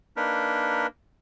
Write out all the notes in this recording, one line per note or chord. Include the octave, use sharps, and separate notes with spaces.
A#3 D4 D#4 A#4 B4